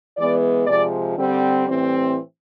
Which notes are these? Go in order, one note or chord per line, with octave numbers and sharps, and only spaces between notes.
E3 G#3 B3 D5
C3 F3 G#3 D5
D3 G3 C4
A2 E3 G3 C4